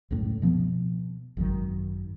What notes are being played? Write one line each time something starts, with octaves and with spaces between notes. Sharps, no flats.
C#2 F#2 A2
B2 F3 B3
G#1 F#2 A#2 D#3